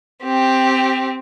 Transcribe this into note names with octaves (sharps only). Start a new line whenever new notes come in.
C4 G4